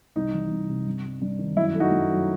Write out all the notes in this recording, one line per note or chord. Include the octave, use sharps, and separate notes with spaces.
C2 D#4
E3
C2
C3
G2
G3
G2
D#3
F#2 E4
A3
D#4 F#4
F#2
F#3